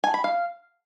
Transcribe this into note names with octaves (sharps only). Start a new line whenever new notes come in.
G#5
B5
F5